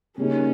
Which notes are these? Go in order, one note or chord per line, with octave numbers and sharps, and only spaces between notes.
C#3 G3 A#3 C#4 D#4